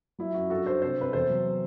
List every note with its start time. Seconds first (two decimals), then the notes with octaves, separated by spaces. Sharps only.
0.19 F#3 E4
0.34 F#2 F#4
0.50 G2 F#4 A4
0.66 G2 A4 C5
0.82 C3 A4 C5
0.98 C3 B4
1.13 E2 A4 C5
1.29 F#3